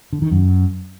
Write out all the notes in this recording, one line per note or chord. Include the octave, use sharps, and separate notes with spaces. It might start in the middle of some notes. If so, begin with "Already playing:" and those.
D3
D#3
F#2